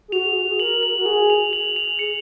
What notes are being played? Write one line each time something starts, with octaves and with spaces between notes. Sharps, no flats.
G#4
F#4 F7
G#4
F#4
G#4
A#4 F#7
F#7
F#4
G#4 F#7
F7
F#7
F7
G#4 C#7